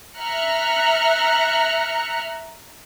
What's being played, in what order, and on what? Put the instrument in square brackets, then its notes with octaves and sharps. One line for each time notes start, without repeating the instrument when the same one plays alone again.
[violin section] E5 A#5 F6 F#6 C#7